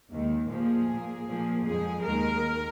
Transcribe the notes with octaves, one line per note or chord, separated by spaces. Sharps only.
D#2 D#3 G#3
A#2 F3 A#3 G#4
A#2 A#3
A#2 F3 A#3
F2 F3 G#3 G#4
D#2 D#3 G#3 A#4